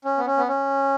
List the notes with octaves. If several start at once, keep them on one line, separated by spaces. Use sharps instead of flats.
C#4
B3
C#4
B3
C#4